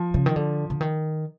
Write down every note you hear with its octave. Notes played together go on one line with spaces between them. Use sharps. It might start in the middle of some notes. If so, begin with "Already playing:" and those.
Already playing: F3
C#3
D#3
D3
D3
D#3